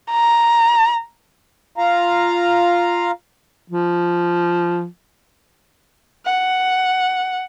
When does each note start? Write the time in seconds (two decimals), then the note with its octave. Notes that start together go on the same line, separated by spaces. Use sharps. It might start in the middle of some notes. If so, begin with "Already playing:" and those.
0.11 A#5
1.78 F4 F5 A#5
3.70 F3
6.26 F#5